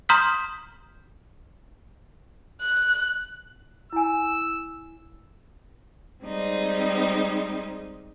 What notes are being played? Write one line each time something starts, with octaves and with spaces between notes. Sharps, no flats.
A#5 C6 D#6 F6 G6 B6
F#6
E4 G#5 E6
G3 G#3 C4 D#4